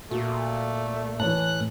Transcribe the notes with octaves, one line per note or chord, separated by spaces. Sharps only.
A#2 A3 F#4
A2 E3 C#5 A5 F#6